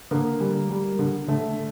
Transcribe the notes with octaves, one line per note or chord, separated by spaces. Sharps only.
D3 A#3
G3
G3
D3
D3 A3